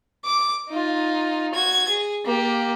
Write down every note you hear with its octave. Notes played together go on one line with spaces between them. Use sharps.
D6
D#4 F4
F#4 G#6
G#4
A#3 G4